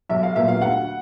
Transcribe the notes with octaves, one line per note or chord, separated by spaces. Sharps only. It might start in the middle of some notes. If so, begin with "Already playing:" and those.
B1 E5
F5
A#2 F#3 B3 E5
F5
D2 F#5